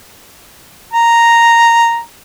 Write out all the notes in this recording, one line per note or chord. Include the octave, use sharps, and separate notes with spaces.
A#5